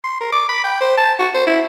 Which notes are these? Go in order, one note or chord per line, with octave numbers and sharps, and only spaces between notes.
C6
A#4
D6
B5
G5
C5
A5
F#4
C5
E4